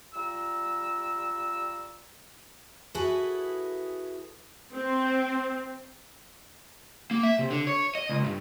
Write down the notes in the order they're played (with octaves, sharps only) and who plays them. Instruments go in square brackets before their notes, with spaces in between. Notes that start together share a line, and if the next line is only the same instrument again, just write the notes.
[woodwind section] G3 F4 A#5 E6
[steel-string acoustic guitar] E4 F#4 G#4 A4 B4
[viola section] C4
[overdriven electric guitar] A#3
E5
C3
D3
C#5
D#5
C#2
G2